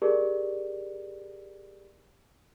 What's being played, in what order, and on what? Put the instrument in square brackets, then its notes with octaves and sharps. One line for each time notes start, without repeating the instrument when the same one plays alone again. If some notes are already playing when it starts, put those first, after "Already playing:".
[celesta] G4 G#4 A#4 D5